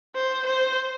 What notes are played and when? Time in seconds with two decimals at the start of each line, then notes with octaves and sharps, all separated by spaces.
0.15 C5
0.46 C5